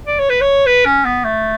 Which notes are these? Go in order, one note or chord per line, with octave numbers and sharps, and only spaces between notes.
D5
C#5
B4
C#5
B4
C#4
B3
A3